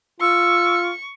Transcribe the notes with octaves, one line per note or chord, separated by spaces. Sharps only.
F4 C#6 E6